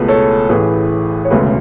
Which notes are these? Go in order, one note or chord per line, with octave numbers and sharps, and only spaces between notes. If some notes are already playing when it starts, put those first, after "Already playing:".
Already playing: C#2 B2 A3 G#4 B4
A4 C#5
A1 A2 E3 G#4 B4
C#5
E1 D2 C#3 G#3 G#4 B4